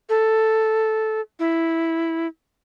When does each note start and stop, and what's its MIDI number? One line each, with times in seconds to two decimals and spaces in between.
0.09 1.21 69
1.39 2.27 64